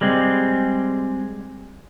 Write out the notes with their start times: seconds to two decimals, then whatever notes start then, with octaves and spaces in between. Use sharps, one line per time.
0.01 G3 G#3 C4